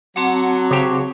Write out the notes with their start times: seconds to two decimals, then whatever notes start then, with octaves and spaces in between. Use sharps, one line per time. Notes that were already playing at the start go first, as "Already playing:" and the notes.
0.16 F#3 C4 F#5 A5 D6
0.71 C#3 G4 C5 C#5